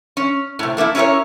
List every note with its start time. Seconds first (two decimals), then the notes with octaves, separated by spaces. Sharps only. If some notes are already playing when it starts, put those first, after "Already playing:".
0.17 C#4
0.59 A2 C3
0.77 A3 A#3 C#4 E4
0.95 C#4 E4 G4 A#4 C#5